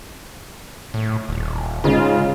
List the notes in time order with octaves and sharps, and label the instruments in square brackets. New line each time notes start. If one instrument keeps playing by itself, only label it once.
[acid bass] A2
D#1
[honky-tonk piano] G#2 C#3 [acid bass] F4